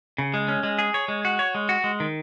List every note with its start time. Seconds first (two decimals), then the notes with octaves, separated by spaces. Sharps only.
0.18 C#3
0.34 G#3
0.48 C#4
0.63 G#3
0.79 G#4
0.94 C#5
1.08 G#3
1.25 F#4
1.39 C#5
1.55 G#3
1.69 F#4
1.84 G#3
2.00 D#3